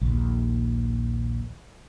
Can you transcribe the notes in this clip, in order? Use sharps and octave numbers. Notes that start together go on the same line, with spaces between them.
A#1 D#2